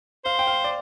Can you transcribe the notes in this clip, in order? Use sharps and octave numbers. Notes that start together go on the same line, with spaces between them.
C5 F5
G5
F5
D5